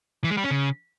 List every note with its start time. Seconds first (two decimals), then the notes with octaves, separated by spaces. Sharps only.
0.24 E3
0.31 G#3
0.37 G3
0.44 C#4
0.51 C#3